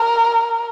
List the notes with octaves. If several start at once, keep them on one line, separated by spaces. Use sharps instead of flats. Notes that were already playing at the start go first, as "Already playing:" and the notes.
Already playing: A#4